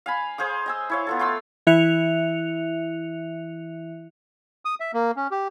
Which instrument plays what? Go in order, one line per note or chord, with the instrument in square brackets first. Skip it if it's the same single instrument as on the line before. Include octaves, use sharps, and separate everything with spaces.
[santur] F5 G#5 B5
G#4 C5 F5 D#6
D#5 G#5 E6
E4 C#5 F5
B3 F4 A4
A3 F5 C6 E6
[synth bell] E3 E4 E5 F#6 C#7 F7
[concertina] D#6
E5
A#3
C#4
G4